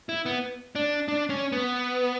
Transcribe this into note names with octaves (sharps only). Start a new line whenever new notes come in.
E4
B3
D4
D4
C#4
B3